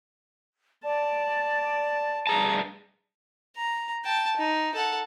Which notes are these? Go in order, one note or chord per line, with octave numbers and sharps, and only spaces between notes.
D5 A5
G2 G#4 A5 A#5
A#5
G5 A5
D#4
A4 F#5